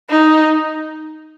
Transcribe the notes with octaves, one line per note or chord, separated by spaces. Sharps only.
D#4